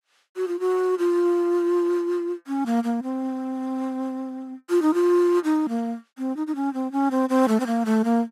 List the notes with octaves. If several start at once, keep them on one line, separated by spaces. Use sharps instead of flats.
F#4
F4
F#4
F4
C#4
A#3
A#3
C4
F4
D#4
F4
D#4
A#3
C4
D#4
D#4
C#4
C4
C#4
C4
C4
A3
C4
A#3
A3
A#3